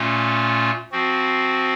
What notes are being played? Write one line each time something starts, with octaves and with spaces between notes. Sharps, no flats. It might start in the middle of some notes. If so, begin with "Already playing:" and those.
Already playing: A#2 A3 C#4 F4
F3 C4 F#4